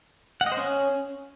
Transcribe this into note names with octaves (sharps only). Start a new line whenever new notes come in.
F#5
D#5
C5
C#4